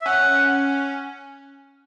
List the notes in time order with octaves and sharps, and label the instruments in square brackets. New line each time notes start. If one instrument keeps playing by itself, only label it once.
[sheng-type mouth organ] E5
[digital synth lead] C#4 [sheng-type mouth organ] F#5